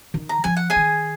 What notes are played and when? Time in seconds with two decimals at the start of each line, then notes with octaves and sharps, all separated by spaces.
0.14 D#3
0.29 A#5
0.44 F3 G#5
0.57 F#5
0.70 G#4 G#5
0.76 D#3